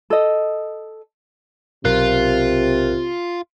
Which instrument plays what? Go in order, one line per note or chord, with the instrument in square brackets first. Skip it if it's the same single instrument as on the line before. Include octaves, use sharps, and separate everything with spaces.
[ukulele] A4 D#5
[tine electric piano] B1 A#4 F#6 [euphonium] C3 [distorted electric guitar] F4